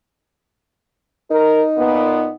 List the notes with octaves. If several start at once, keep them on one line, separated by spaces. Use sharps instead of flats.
D#4 A#4
A#2 B3